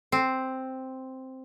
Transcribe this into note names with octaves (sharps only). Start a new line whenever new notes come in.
C4